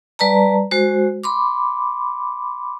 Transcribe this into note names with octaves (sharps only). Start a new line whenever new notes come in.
G3 B4 D5 A5 A#5
G#3 F#4 C5
B5 C6 D6